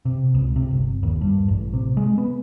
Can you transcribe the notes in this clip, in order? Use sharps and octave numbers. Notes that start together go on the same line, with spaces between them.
C3
C#2
C3
G1
D#2
G2
A1
C3
G#3
B3